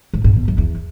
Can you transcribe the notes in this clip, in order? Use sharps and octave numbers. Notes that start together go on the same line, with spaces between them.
G#2
G#2
B2
F#2
E2